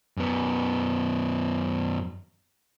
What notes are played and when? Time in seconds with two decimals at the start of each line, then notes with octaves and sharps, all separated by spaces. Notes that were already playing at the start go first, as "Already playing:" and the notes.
0.17 F#2 B3